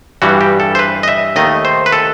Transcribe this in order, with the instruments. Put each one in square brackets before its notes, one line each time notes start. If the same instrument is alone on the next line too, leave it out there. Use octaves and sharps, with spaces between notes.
[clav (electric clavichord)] G2 E3 G3 F#4
G4
A4
C5
B4
D#5
E5
D#2 D#3 A3 D#5
C5
B4
A4